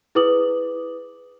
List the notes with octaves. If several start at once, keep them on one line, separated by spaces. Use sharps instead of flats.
E4 G#4 B4 D6 D#6 F#7